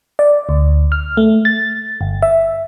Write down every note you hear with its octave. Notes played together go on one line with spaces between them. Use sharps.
D5
D2
F6
A3
A6
G1
E5